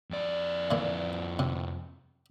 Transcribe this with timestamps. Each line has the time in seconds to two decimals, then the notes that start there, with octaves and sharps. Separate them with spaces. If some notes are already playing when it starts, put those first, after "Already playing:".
0.11 F2 D5
0.71 A#2 E3
1.39 C3